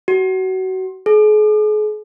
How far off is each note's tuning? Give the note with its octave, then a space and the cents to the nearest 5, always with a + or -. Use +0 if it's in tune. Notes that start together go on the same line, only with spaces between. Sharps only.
F#4 +25
G#4 +40